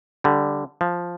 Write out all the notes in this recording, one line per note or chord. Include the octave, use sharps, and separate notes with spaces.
D3 G3
F3